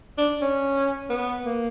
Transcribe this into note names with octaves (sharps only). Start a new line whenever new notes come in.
D4
C#4
B3
A#3